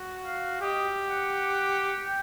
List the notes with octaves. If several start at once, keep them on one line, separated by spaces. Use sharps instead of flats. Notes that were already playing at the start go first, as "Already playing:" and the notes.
Already playing: F#4
F5
G4 D#5
F#5
G5